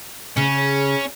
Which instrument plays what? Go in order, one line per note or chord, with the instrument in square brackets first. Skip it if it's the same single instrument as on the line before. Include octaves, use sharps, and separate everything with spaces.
[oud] C#3 [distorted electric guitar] C#4